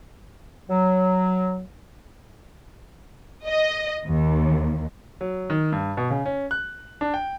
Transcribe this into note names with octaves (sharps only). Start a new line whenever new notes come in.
F#3
D#5
D#2
F#3
D#3
G2
B2
C#3
C#4
F#6
D4
G5